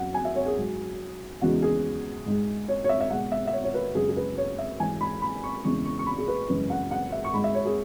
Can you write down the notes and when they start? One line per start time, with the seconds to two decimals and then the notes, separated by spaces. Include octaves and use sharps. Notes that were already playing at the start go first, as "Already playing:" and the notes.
Already playing: F#2 F#3 F#5
0.14 G#5
0.25 E5
0.36 C#5
0.46 G#4
0.57 G#2 F#3
1.42 E2 C#3 E3 G#3 F#4
1.62 G#4
2.26 G#2 G#3
2.68 C#5
2.84 C#5
2.89 E5
3.00 E5
3.10 B2 G#3 F#5
3.32 E5
3.47 E5
3.53 C#5
3.64 C#5
3.74 B4
3.95 F#2 C#3 G#3 G#4
4.09 G#4
4.16 B4
4.38 C#5
4.58 E5
4.80 G#2 E3 G#3 G#5
5.01 B5
5.22 B5
5.43 C#6
5.64 E2 C#3 E3 G#3 C#6
5.85 C#6
5.99 C#6
6.06 B5
6.18 G#4
6.28 B4
6.49 F#2 C#3 E3 G#3 B4
6.70 F#5
6.91 F#5
7.12 E5
7.24 C#6
7.33 G#2 G#3 B5
7.44 E5
7.55 C#5
7.65 G#4